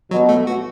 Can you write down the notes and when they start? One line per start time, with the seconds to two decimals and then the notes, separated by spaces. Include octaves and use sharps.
0.11 B2 F#3
0.29 A3
0.47 F#4